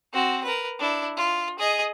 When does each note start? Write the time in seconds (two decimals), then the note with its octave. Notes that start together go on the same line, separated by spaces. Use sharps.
0.14 C4 F#4
0.44 A#4 B4
0.79 D4 E4
1.17 F4
1.59 G#4 D#5